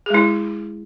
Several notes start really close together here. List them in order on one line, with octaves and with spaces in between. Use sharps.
G#4 G#3 E4